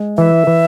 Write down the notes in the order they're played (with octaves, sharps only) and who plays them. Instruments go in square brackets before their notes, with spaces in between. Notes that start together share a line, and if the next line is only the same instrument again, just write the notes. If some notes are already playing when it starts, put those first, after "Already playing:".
Already playing: [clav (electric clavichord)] G#3
[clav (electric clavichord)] E3 [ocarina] E5
[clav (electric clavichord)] E3